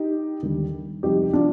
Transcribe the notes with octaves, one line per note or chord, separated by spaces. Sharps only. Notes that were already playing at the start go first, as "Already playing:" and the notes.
Already playing: D#4 G4
D#2 D3 G3
F2 C3 G3 D#4 G4
D4 F4